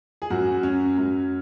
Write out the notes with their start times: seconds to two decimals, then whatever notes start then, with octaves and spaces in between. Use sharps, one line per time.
0.22 G#4
0.30 F#2 F#3 F#4
0.63 C#4
0.97 F#2 F#3